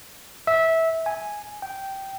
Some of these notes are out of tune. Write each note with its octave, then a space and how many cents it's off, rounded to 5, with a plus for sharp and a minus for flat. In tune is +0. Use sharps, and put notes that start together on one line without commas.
E5 -15
G#5 +0
G5 -10